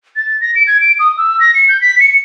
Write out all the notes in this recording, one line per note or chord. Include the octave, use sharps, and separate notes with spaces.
A6
A#6
D7
G#6
D7
D#6
E6
A#6
C#7
G6
B6
C#7